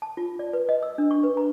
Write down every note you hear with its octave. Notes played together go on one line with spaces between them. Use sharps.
A5
F4
D5
B4
D#5
E6
D4
C#6
B4
A#5